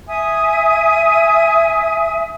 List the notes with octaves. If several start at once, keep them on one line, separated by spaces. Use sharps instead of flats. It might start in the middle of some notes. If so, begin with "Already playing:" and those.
E5 G#5 D#6